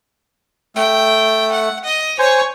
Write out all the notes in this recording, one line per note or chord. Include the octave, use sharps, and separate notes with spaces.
A3 G5
F#5
D#5
C5 C#5 G#5 C#6